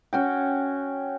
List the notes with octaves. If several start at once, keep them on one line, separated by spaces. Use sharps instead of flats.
C#4 F#4 G5